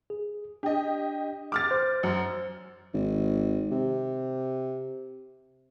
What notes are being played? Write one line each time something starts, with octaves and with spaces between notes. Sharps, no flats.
G#4
D4 G4 D#5
D6 F6 A6
C5
F#2
G#1
C3